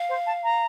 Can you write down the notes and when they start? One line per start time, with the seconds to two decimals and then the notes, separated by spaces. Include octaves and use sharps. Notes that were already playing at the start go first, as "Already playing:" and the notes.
Already playing: F5
0.09 C5
0.26 A5
0.44 A#5